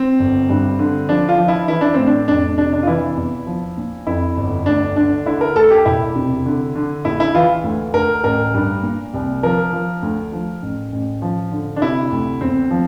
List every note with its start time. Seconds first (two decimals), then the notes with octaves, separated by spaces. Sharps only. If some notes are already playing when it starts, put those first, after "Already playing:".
Already playing: C4
0.19 G1
0.49 G2
0.79 D3
1.09 F3 D4
1.29 F4
1.38 F3
1.48 E4
1.68 E3 E4
1.81 D4
1.94 A2 C4
2.07 D4
2.28 F2 D4
2.58 C3 D4
2.73 D4
2.83 F4
2.87 E3 E4
3.17 E2
3.47 F3
3.77 A#2
4.07 F2 E4
4.37 G1
4.66 D2 D4
4.96 D3 D4
5.26 D3 E4
5.41 A#4
5.56 D2 A4
5.70 G4
5.85 E1 E4
6.16 C3
6.46 D3
6.75 D3
7.05 A#1 E4
7.20 E4
7.35 E3 F4
7.64 D2
7.94 D2 A#4
8.24 A1 A#4
8.54 G2
8.83 A#2
9.14 C2
9.43 F3 A#4
9.73 F3
10.03 D2
10.32 F3
10.62 A1
10.92 A1
11.22 F3
11.52 D3
11.76 D4
11.82 C3 E4
12.12 D2
12.41 E2 C4
12.71 F3